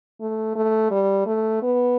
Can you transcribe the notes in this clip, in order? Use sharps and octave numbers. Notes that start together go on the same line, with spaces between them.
A3
A3
G3
A3
B3